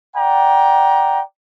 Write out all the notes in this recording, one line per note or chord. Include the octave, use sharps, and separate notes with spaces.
D5 F#5 G5 A#5